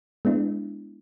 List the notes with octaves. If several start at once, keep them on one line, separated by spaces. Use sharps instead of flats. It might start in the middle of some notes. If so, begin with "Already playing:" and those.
G#3 B3 D4 E4